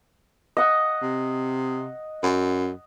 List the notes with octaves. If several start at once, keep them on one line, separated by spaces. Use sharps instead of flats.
D#5 F#5
C3
F#2